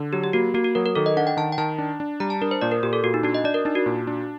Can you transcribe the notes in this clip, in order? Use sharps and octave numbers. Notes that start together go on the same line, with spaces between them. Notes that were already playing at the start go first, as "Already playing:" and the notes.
Already playing: D3
F#3 G4
G4
A#3 F#4
A#3 F#4
F#4
F#3 A#4
A#4
D#3 A4
D#5
D4 F#5
G5
D#3 A5
G5
D#3 A5
D4
D4
G3 A#5
A5
D4 A#4
C5
A#2 D5
A#4
A#2 G4
A4
A#2 F#4
D#4
D4 F#4
D#5
D4 D5
A#4
D4 D#4
F#4
A#2
D4